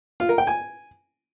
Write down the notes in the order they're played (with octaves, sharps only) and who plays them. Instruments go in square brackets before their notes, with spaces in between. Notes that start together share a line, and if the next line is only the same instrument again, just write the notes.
[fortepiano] F4
A#4
G5
G#5